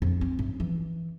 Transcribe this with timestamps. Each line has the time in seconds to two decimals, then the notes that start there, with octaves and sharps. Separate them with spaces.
0.02 F2
0.21 C4
0.39 F#2
0.60 E3